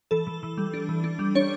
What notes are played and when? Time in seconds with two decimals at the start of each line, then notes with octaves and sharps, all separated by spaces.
0.11 E3 A4
0.27 E3
0.43 E3
0.58 G3
0.74 D4
0.89 E3
1.04 D4
1.19 G3
1.35 D4 C#5